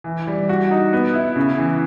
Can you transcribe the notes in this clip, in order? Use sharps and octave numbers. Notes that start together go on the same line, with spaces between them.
E3
G3
F#4
D#4
B3
E4
C#3
E3